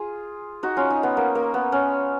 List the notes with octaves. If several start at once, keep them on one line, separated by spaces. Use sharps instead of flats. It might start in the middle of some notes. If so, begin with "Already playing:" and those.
Already playing: F4 G#4
D#4 F#4
C#4 F4
D#4
B3
A#3
A#3
B3
C#4